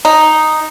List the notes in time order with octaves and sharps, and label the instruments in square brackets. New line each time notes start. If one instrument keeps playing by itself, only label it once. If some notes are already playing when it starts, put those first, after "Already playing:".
[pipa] D#4